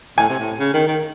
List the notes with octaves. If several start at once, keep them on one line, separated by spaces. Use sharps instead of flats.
A2 G#5
C3
A2
C#3
D#3
D#3